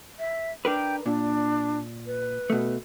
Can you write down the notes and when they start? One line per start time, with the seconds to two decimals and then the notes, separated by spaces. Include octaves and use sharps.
0.19 E5
0.65 D4 A#4 B4 G5
1.06 A#2 D4
2.06 B4
2.50 B2 A3